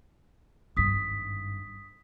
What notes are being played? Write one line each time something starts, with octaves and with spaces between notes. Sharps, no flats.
G#1 G2 D#6 B6